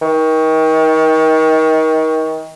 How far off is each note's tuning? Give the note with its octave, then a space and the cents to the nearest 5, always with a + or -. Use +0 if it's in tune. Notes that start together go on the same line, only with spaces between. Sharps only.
D#3 +30